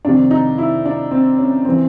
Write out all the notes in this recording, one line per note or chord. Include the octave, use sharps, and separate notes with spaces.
F2 C3 D#3 D4
D#4
E4
D4
C4
C#4
E3 C4